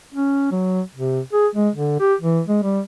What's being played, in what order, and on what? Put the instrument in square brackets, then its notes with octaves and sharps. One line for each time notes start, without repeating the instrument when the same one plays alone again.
[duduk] C#4
F#3
C3
G#4
G#3
D3
G4
E3
G#3
G3